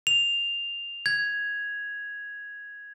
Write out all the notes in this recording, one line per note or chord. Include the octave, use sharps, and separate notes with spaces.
F7
G#6